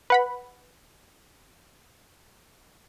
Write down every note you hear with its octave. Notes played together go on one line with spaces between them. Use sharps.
B4 F#5 B5